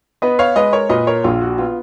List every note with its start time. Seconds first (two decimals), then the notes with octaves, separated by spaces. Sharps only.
0.22 B3 B4 D#5
0.39 C#5 F5
0.56 G#3 B4 D#5
0.73 A#4 C#5
0.89 A#2 B4 D#5
1.07 A#4 C#5
1.24 A#1 F4
1.41 F#4
1.58 B3 F4